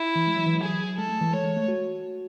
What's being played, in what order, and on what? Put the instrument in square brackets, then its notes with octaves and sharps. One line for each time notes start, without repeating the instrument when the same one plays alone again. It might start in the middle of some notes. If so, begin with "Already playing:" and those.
Already playing: [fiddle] E4
[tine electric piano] E3
G#3
F#3
E3
F#3
[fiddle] G#4
[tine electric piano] G#3 [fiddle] A4
[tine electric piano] A3
E3
[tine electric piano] G#3 [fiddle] C#5
[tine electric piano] G#3
A3
F#4